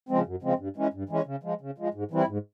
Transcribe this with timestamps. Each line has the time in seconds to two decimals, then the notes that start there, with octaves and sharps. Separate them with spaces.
0.09 C#3 F3 G#3 C4
0.26 F#2
0.42 C#3 F3 G#3 C4
0.59 G2
0.77 E3 G#3 C#4
0.93 G2
1.09 E3 G#3 C#4
1.26 C#3
1.43 F3 G#3
1.61 C#3
1.78 F3 G#3
1.94 G#2
2.11 E3 G3 C4 E4
2.28 G#2